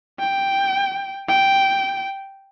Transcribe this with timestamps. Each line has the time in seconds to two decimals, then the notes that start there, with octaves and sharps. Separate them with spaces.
0.20 G5
1.29 G5